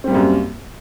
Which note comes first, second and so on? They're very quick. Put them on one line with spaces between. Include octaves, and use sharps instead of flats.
C4 G3 A#3 F#2